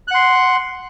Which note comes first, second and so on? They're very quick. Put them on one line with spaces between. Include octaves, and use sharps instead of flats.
F#6 F#5 C6